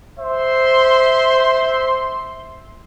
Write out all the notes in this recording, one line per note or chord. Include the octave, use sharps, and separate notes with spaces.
C5 E5 C6